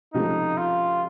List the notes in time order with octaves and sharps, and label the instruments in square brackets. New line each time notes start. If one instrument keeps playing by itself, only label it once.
[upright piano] C#2 C3 F3 A3 [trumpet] D#4
[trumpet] F4